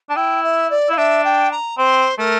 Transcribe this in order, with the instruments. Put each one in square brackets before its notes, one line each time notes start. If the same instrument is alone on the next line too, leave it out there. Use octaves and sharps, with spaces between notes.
[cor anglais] D4 [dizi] A5
[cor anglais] E4 [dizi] G5
[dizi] E5
D5
[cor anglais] E4 [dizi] F5
[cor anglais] D4 [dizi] E5
[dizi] G5
A#5
[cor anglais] C4 [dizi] C5
[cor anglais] A3 [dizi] A#4